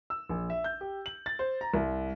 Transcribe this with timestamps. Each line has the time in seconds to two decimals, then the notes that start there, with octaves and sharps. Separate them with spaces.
0.10 E6
0.29 A#1
0.50 E5
0.64 G6
0.81 G4
1.06 F#7
1.26 A6
1.39 C5
1.61 A#5
1.74 C2